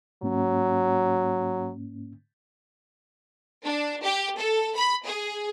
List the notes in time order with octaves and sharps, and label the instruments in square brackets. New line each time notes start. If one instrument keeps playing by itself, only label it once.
[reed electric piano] G#2 A#3 C#4 [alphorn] F#3
[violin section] D4
G4
A4
B5
G#4